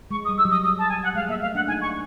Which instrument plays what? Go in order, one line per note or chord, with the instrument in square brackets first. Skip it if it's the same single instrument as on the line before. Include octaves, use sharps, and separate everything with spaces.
[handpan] G#3 [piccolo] C#6
[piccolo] D#6
[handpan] G3
[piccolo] E6
[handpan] F#3
[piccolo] D#6
D#6
A5
G#5
F#5
[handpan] G#3 [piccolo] F5
[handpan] A#3 [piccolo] E5
[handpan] A3 [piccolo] F5
[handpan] D4 [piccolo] F#5
[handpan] D#4 [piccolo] G#5
[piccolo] C#6